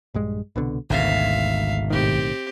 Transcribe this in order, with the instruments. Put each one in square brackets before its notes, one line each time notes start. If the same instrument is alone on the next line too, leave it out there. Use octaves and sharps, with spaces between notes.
[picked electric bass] A#1 G2 G#3
C2 B2 D3
[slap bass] G#1 G#2 B2 [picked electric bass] D2 [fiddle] E5 F5
[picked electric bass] B1 A2 D#3 [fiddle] C4 G4